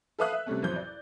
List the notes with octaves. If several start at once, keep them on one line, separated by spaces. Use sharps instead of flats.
A4 B4 E5 F5 D#6 F#6
E5
C3 G3 A3 C#4
A1 F2 F#3 C5 G6
D5